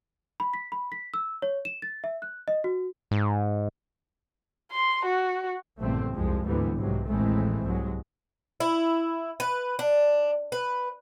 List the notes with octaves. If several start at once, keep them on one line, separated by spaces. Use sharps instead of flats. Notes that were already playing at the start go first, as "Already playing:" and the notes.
B5
B6
B5
B6
E6
C#5
E7
A6
E5
F#6
D#5
F#4
G#2
C6
F#4
A#1 E2 G2 D3 A3 C4
C2 F2 F3 G#3
D2 G#2 D3 E3 G3 B3
B1 G#2 C3 F#3
A1 D#2 E3 G#3 A3 C4
C2 G#2 F#3 G#3
E4
B4
D4
B4